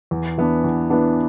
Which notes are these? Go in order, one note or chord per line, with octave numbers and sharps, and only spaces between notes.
E2
E3 B3 D4
E2
E3 B3 D4